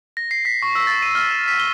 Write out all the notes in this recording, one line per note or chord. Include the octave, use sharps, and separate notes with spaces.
A#6
C7
B6
C#6
E6
A6
D#7
F6
E7
B6
G7